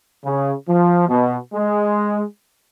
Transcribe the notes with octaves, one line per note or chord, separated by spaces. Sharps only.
C#3
F3
B2
G#3